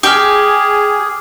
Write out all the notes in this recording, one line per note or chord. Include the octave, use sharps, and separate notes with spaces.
G4 G#4 D6 F6